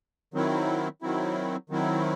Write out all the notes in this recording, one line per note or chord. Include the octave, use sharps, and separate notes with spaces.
D#3 F#3 C4 E4
D#3 F#3 C4 E4
D#3 F#3 C4 E4